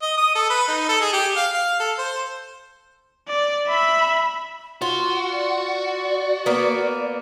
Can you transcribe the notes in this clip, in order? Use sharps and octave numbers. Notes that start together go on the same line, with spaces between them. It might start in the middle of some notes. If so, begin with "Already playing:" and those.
D#5
D#6
A4
B4
D#4
A4
G#4
G4
F5
F5
A4
C5
D5
E5 B5
F4 F#4 F#5
D5
A#3 B3